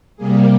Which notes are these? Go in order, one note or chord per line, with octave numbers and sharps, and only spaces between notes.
C3 G3 A#3 G#4